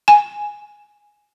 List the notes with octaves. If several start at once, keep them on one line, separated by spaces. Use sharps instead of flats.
G#5